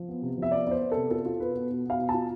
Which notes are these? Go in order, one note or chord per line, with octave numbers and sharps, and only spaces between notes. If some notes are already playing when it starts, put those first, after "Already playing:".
Already playing: F3
B3
C3
F3 E5
B3 D5
B3 C5 D5
B3
C3 A4
F4 A4
F4
B2 B4
B3
B2
B3 F5
B2
A5
F4